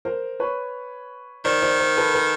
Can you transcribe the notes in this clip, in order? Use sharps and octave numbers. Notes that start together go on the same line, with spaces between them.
A#4 C5
B4 C#5
D#3 C5 D5
C5 D5
A#4 C5
A4 B4
A4 B4